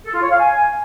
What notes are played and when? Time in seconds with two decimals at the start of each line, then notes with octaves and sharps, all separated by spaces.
0.05 A4
0.14 F4
0.22 C#5
0.30 F5
0.39 G#5